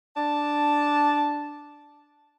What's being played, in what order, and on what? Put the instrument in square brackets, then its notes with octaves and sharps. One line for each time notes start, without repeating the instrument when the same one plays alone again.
[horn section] D4 A5